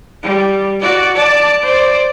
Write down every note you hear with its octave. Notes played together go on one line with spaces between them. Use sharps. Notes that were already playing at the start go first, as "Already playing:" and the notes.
G3
F#4 D5
D5 A5
C5 D5